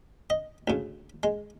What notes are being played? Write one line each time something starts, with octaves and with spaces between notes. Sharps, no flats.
D#5
D2 C#3
G#3